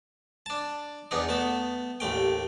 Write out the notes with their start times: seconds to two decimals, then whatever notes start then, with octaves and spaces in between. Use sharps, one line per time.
0.46 D4 A5
1.11 E2 B3 D4 D#4
1.29 A3 B3 A5
2.00 A1 D#2 A3 G5